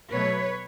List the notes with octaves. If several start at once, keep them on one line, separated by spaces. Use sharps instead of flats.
B2 F#3 A3 B4 C#5